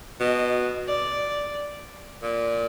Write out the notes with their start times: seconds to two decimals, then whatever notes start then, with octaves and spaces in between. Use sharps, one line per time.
0.20 B2 D#5
0.88 D5
2.23 A#2